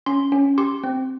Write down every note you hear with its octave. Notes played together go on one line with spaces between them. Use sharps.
C#4 C6
C#4
G4 C6
C4